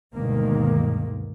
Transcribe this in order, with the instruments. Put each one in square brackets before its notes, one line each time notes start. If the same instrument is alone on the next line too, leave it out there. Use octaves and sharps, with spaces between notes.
[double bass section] D2 G2 B2 D#3 G#3 A#3